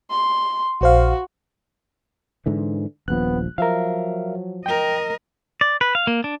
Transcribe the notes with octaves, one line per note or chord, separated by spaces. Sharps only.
C6
A#1 F#4 C5 F5
G#2 D3 E3
D#1 A#1 F3 B3 F#6
F3 F#3 A#4 E5 F5
A#4 D#5 G5
D5
B4
F5
A#3
D4